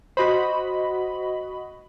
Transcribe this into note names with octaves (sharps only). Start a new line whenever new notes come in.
F#4 C5 D#5 B5